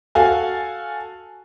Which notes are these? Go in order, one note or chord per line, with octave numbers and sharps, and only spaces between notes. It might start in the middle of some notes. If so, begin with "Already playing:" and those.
F#4 A4 F5 G#5